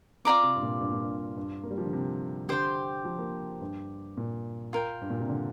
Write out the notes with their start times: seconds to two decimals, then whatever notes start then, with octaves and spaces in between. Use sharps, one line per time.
0.25 C4 F4 D5 A#5 D6
0.44 C3
0.56 G2
0.62 A#2
0.81 G2
0.92 A#2
1.03 G2
1.37 G2
1.63 A#3
1.71 G3
1.78 F3
1.85 D3
1.93 C3
2.49 D3 G4 C5 G5 C6
3.05 F3
3.19 A#3
3.61 G2
4.17 A#2
4.73 F4 A#4 G5
5.01 G2
5.10 A#2
5.20 C3
5.29 D3